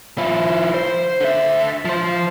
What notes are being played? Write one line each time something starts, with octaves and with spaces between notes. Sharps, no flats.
F3 E4
C5
D3 E5
F3 C5